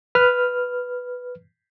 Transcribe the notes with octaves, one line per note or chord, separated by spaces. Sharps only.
B4 F6